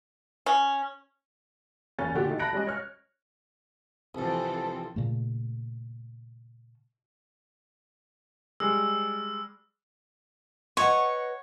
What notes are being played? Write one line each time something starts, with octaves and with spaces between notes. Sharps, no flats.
C#4
F#1 E2 C#3 C#4 A6
A#2 D3 A3 F#4 G4
D#3 A3 D#4
A5 B5 F#6 A#6 D7
G3 G#3 C#4 D#5
C#5 F6
C2 F2 E3 C4 A4
A#2 C#3 A3
G3 G#3 E6
B4 C#5 D#5 F#5